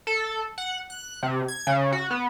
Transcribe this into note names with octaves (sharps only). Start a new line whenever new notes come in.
A4
F#5
F#6
C3
G#6
C#3
F#4
B3